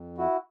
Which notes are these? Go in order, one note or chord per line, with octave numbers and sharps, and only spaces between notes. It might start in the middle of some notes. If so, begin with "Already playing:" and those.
Already playing: F2
E4 F#4